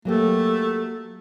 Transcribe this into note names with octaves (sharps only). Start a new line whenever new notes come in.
F#3 A3 A#3 G4